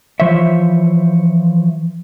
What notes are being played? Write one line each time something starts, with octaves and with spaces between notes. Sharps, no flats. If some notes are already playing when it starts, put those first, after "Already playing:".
E3 F3 C5 C#5 E5